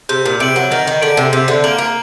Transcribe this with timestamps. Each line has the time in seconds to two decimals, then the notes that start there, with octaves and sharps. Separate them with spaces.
0.09 C3 G6
0.25 A#2
0.40 C3 D7 F#7
0.56 F#3
0.71 D#3 G6
0.87 D#3
1.02 D3 D7 F#7
1.17 C3
1.33 C3 G6
1.48 D3
1.64 A#3 D7 F#7
1.78 A#3